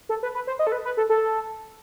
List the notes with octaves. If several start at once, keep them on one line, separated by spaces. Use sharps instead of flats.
A4
B4
B4
C5
D#5
A4
B4
B4
A4
A4